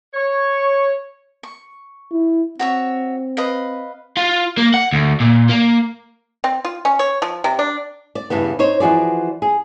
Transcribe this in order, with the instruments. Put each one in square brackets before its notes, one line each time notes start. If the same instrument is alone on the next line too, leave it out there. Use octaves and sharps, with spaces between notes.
[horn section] C#5
[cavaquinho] C#6
[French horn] E4
[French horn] C4 [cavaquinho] F#4 C#5 E5
[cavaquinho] B4 D#5 F5
[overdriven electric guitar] F4
A#3
F#5
D2
A#2
A#3
[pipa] C4
F4
C#4
C#5
F3
C3
D4
[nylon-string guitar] D5
E2 G2 C#3 G3 B3
D#4 C5 C#5
E3 F3 F#4 G#4 D5
G#4